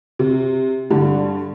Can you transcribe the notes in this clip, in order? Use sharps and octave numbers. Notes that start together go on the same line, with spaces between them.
C3
G2 D3 G3